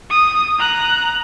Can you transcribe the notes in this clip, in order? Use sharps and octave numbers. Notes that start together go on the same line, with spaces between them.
D#6
A#5 F#6